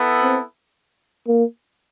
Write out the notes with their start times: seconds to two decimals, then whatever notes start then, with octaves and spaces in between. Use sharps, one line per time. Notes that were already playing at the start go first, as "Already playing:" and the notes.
Already playing: B3 E4 A4
0.21 C4
1.28 A#3